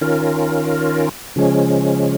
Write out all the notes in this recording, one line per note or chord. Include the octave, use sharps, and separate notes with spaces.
D#3 C#4 F4 A#4
C#3 F3 G#3 C#4